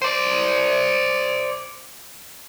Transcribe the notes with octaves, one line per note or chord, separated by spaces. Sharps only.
C5 D5